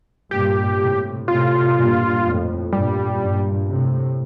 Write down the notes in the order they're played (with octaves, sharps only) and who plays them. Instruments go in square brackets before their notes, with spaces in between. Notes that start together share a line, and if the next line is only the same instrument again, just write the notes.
[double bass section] G2 A#2 [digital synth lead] G4
[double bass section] A2 C3
[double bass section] A2 C3 [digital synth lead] F4
[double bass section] G2 A#2
F2 A2
[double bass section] G2 A#2 [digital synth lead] G3
[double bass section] G2 A#2
A2 C3